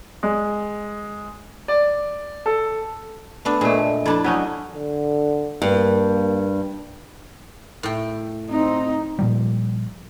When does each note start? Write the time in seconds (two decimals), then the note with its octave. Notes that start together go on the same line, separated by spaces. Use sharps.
0.23 G#3
1.68 D5
2.46 A4
3.45 A3 B3 D4
3.61 A#2 G#3 A3
4.06 F2 D4 E4 A4 A5
4.24 F#3 C#4 D#4 E5
4.75 D3
5.62 G2 A#3
7.83 A2 G5
8.50 C4 D#4
9.19 A#2 F3 G3